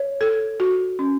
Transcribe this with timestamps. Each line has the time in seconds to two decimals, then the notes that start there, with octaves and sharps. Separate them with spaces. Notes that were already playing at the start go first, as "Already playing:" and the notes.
Already playing: C#5
0.21 A4
0.60 F#4
0.99 C#4